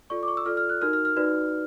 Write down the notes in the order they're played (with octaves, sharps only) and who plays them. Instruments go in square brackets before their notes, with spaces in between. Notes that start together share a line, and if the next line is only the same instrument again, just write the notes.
[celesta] F4 A4 D5 C#6
D6
C#6
E6
F4 A4 D5 F6
F6
F#6
D#4 F#4 A#4 F6
F6
F6
D#4 F#4 B4 D5